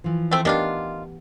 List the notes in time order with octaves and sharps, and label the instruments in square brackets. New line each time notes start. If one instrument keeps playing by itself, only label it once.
[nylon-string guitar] E3 F3
[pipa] A3 C4
[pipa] D#3 D4 F4 [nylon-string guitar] A3 B3 G4